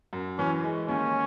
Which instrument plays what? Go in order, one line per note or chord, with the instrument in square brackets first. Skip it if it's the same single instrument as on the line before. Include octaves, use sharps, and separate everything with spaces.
[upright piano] F#2
[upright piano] E3 [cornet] C#4
[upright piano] G#3
[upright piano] D#2 [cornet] C#4